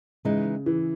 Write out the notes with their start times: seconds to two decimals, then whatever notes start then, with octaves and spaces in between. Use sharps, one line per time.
0.25 C#3 E3 G#3 D#4
0.66 E3